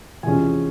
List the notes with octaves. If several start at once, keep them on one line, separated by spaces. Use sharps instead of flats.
E2 C3 F3 G#3 C#4 G#5